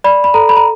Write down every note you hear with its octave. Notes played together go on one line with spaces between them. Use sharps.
D5 B5
B5
A4 A#5
B5
A#5